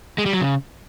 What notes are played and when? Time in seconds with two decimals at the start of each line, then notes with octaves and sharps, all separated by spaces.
0.18 G#3
0.26 G3
0.33 F#3
0.41 C#3